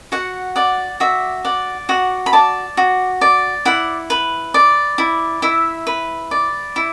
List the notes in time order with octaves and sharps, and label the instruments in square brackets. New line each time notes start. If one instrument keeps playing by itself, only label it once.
[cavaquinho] F#4 F#5
D5 F#5
F#4 E5
D5 F#5
F#4 F#5
B5
D5 A5
F#4
D5
E4 F#5
B4
D5
E4
E4 E5
B4
D5
E4